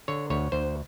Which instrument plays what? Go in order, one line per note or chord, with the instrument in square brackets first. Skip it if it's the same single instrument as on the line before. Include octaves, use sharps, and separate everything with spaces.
[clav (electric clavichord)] D3 C#5
D2 C#5
D2 C5